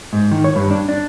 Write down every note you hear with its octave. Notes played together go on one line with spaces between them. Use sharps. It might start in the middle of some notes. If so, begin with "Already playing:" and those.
G#2
D#3
C#5
G2
D4
D4